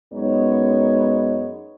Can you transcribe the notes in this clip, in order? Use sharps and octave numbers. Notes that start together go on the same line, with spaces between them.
F#2 G#3 B3 D#4 C#5